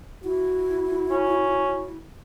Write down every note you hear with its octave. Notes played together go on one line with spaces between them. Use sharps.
E4 F#4
C#4